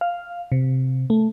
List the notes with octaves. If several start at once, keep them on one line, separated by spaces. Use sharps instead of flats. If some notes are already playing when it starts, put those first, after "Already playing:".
F5
C3
A3